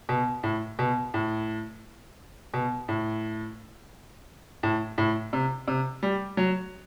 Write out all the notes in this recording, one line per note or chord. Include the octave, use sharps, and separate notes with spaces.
B2
A2
B2
A2
B2
A2
A2
A2
C3
C3
G3
F#3